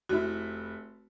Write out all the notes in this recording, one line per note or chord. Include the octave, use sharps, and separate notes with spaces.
F1 E4 F#4